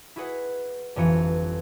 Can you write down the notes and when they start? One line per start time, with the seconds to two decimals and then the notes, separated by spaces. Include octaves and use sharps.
0.16 E4 F#4 G#4 B4 F#5
0.96 G1 F2 E3 C#7